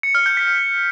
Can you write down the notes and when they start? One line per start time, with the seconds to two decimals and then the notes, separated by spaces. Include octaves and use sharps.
0.03 C#7
0.15 F6
0.26 G6
0.37 B6